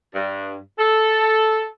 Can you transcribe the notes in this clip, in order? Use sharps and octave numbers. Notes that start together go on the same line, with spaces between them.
G2
A4